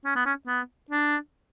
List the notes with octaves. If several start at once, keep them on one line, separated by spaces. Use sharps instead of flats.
C#4
B3
C#4
B3
D4